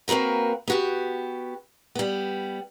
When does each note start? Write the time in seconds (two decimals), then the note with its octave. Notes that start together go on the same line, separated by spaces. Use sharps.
0.08 A#3 C4 F#4 A#4 B4
0.68 B3 F#4 G4
1.95 G3 B3